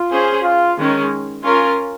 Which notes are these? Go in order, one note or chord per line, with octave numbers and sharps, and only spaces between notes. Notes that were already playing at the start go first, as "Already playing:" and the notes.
Already playing: F4
C#4 G#4 C5
F4
D#3 G#3 C#4
C#4 F4 A#4